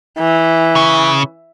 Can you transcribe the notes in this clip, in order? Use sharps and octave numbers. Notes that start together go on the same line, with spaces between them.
E3
C#3